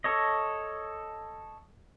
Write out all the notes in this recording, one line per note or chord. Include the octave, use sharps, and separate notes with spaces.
A4 C#5 D#5